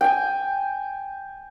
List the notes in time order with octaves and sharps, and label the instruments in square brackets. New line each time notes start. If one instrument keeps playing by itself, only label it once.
[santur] G5 G#5